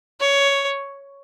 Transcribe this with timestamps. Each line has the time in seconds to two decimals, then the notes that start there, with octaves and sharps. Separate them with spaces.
0.20 C#5